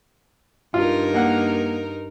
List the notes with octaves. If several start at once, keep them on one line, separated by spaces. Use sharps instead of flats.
G2 D#4 F4 A#4
A#3 F#5